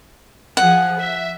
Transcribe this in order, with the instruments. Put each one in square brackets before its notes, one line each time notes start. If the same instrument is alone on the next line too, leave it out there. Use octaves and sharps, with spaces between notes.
[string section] F3 G#4 [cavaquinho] F#5
[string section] E5